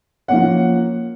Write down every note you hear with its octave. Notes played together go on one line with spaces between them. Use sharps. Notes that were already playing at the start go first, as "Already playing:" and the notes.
F3 A#3 C#4 F#5